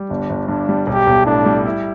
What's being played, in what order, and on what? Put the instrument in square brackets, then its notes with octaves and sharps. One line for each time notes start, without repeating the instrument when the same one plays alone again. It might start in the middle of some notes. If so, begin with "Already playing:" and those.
Already playing: [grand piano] G3
[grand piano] G1 [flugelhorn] D4
[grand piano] G1
[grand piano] G2 [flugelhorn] D4
[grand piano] G3
[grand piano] B1 [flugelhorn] G4
[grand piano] B1
[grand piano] A2 [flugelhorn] D4
[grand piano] G3
E4